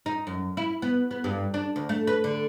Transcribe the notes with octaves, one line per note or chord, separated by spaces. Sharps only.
D#4
F#2
E4
B3
B3
G2
D4
D2
A3
B4
D3